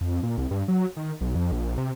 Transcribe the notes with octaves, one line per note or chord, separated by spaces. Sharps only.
F2
A#2
C2
G2
F#3
D#3
B1
F2
A#1
C3